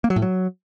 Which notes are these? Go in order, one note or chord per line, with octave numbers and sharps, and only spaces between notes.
A#3
F#3
A2
F#3